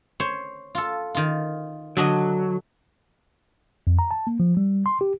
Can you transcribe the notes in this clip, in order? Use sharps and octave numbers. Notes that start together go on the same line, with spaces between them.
C5 C#5
F4 A4
D#3 F4
D3 F#3 D4 D#5
F2
A#5
A5
A#3
F3
G3
C6
G4